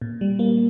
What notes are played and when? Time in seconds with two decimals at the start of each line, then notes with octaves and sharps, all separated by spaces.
0.01 A#2
0.21 G3
0.39 A#3